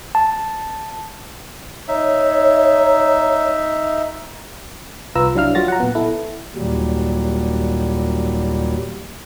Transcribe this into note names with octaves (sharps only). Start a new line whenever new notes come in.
A5
D#4 C#5 E5
C2 F4 B4 A#5 E6
F#3 D4 E4 F5 F6
F#3 F4 F#4 A6 A#6
F#5 A#5
A#2 B3
E4 A4
D#2 A#2 F#3 G3